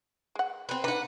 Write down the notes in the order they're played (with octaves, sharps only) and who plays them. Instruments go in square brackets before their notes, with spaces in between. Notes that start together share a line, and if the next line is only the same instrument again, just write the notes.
[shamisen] G#3 F#5
[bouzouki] C4 B4
[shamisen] D4 D#4 [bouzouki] B4 F#5